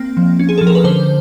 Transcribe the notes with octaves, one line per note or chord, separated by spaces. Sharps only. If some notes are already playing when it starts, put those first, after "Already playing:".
Already playing: A#3 C4
F3
C#4
G#4
F3 A4
A#4
B4
D3 C5